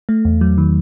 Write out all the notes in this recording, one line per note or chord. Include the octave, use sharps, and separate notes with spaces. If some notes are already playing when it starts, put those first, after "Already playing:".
A3
E2
F#3
D#3